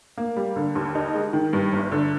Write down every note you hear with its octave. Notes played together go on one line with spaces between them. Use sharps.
A#3
G3
D3
D#2
D#4
G#3
D#3
G2
G1
D3